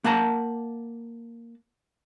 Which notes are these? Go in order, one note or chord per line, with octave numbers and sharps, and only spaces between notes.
A#3 F#5 A5 A#5